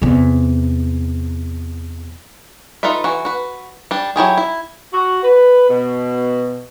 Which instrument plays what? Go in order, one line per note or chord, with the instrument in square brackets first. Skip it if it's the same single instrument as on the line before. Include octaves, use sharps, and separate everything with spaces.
[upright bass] E2 C3
[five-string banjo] D#4 F4 A4 B4 E5
E3 F#4
F#4 B4
G3 D4
F#3 E4 G4 G#4
E4
[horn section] F#4
B4
B2